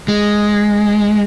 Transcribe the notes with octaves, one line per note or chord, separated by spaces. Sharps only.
G#3